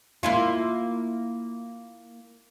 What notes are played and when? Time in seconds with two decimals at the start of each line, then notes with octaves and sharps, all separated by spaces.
0.23 A#3 E4 F4